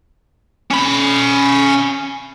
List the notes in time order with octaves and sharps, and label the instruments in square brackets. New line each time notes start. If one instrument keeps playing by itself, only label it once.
[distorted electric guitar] C#4 B5